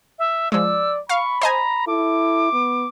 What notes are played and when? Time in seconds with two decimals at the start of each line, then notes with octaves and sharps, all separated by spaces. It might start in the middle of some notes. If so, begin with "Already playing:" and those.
0.19 E5
0.52 F3 G#3 D5 E6
1.09 F5 B5 C#6
1.42 C5 D#5 G#5 A#5
1.87 E4 A4 D6
2.52 B3